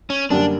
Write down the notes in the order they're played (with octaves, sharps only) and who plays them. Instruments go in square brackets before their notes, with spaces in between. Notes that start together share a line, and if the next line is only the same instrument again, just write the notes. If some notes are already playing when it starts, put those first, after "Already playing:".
[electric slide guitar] C#4
[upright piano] F#2 D3 G3 A#3 [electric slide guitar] D4